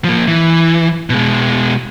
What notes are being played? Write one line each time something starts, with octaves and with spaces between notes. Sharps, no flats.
F3 A#3
E3
B2 G#3